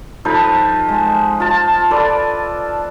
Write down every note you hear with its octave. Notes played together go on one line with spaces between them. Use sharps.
F3 D#4 A4 B4
G#3
F4 A5
A4 B4 D5